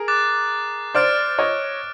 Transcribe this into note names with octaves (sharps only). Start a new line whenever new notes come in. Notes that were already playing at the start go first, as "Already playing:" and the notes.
Already playing: G#4 A#4
D6 F#6 A6
C5 D5 D6 F6 A6 D7
C#5 D#5